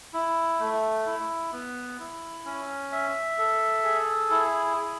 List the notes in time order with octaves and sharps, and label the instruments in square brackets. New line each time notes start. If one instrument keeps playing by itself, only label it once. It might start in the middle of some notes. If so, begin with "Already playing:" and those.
[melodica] E4
A3
E4
B3
E4
C#4
E5
A4
G#4
E4
G#4